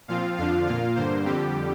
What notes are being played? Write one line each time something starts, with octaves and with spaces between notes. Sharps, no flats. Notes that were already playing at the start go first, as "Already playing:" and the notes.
A#2 F3 C4 F4 F5
F2 D3 F3 D4 F4 F5
A#2 A#3 F4 F5
G2 D3 A#3 C5
F2 D3 G3 C4 G4